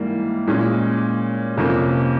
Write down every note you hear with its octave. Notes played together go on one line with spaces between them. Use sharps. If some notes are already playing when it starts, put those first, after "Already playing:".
Already playing: G#2 E3 G3 A#3
A#2 G#3 C#4
F2 C3 F3 A#3 C#4